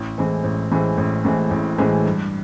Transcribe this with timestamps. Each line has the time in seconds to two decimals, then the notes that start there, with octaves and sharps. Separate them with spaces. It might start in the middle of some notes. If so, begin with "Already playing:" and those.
Already playing: A1
0.18 A2 E3 G#3 C4
0.44 A1
0.72 A2 E3 G#3 C4
0.98 A1
1.25 A2 E3 G#3 C4
1.51 A1
1.78 A2 E3 G#3 C4
2.06 G2